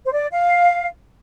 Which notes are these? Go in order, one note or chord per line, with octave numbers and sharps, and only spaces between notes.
C5
D5
F5